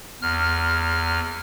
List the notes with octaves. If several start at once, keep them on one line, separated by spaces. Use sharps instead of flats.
E2 F6